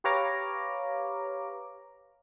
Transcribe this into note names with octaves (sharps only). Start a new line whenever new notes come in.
G4 B4 C#5 F5 A#5 D6